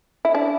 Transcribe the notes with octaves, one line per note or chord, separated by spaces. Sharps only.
E4
D4